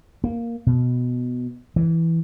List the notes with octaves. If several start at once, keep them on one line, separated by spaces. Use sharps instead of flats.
A#3
B2
E3